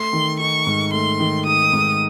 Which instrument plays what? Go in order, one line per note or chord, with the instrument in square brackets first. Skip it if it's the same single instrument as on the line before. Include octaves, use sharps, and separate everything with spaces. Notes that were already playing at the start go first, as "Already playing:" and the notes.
Already playing: [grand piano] A3 [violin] C6
[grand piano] D#3
[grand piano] D#4 [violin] C#6
[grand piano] G#2
[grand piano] A3 [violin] C6
[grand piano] D#3
[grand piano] D#4 [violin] D#6
[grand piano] G#2